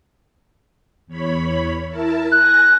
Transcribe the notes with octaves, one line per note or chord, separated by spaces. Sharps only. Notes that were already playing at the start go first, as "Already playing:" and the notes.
E2 C#5 B5
E4 A#4 A5
G#5 F#6 A#6